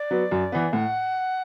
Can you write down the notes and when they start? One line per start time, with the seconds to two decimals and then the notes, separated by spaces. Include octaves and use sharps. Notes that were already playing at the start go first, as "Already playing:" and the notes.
Already playing: D5
0.11 F#3 B3
0.31 F#2
0.52 E3 B3
0.73 A2 F#5